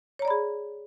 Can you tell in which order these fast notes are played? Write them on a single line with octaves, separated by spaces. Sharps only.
C#5 A#5 D5 B5 G#4